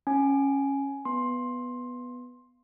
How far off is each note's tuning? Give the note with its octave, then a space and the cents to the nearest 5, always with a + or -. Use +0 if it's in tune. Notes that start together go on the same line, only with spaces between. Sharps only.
C#4 -10 G#5 +10
B3 +0 C6 +15